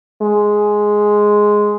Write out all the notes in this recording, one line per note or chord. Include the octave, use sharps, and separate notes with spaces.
G#3